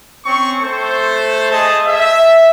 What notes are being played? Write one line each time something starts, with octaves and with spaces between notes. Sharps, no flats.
C4 C#4 C#6
A3 A4 C5
G#4 D#5 A5
E5